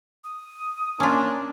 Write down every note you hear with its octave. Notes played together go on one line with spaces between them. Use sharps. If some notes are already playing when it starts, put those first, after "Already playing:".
D#6
A#3 C#4 D4 F4